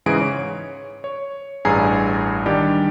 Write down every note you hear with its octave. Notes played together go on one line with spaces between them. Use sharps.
G#2 C#3 E3 G#4 D7
C#5
C#5
A1 G2 G#4 G#5 A#5 C7
D#3 G3 D4 G4